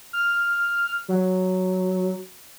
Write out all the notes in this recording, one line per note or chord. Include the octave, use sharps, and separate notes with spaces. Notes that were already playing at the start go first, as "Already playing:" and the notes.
F6
F#3